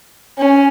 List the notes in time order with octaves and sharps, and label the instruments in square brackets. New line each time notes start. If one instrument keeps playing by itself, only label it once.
[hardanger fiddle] C#4